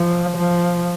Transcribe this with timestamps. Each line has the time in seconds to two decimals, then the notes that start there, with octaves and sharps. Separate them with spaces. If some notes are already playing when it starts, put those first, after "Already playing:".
Already playing: F3
0.38 F3